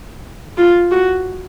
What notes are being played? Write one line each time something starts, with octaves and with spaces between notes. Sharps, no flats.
F4
F#4